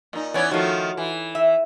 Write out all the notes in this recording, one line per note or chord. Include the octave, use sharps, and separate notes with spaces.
A#2 D#4
E3 B3 C#4 C#5 D5
D#3 F3 A3 F4 F#4
E3
E5